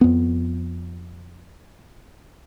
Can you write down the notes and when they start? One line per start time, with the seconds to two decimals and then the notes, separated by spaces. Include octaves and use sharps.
0.01 F2 B3